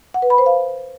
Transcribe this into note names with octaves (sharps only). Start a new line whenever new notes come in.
F#5
B4
B5
C5
F5